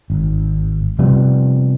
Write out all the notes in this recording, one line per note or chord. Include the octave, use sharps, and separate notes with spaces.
G#1
C3 F3 G3 B3